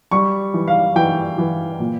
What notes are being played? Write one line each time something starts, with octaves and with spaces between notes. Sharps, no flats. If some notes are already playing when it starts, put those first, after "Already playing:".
G3 C#6
E3
F5
E3 G5
E3
A#2